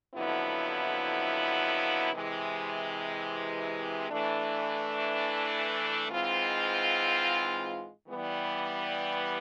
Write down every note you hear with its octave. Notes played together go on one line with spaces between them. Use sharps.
F2 D3 F#3 B3 E4
C3 E3 G#3
E3 A3 D4
G#2 E3 G#3 C4 F4
E3 G3 B3